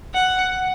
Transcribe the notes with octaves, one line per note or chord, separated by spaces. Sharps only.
F#5